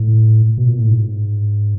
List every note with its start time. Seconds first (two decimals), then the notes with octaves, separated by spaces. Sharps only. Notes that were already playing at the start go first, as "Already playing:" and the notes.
Already playing: A2
0.58 B2
0.67 A#2
0.79 A2
0.89 G#2